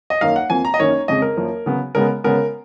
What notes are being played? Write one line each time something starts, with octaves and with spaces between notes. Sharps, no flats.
D#5
F#2 D#3 A#3 F5
F#5
F2 F3 A#3 G#5
A#5
D#5
F#2 D#3 A#3 C#4 C#5
F2 C#3 G#3 D#5
A#4
F#2 F3 A#3
C#3 F#3 B3
C#3 G#3 B3 A#4
C#3 G#3 B3 A#4